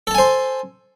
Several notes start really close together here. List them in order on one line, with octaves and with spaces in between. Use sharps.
A4 A5 G#5 C5